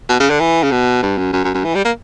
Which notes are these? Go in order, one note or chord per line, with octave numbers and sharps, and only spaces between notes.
B2
C#3
D3
E3
C#3
B2
G2
F#2
F#2
F#2
F#2
E3
G3
A#3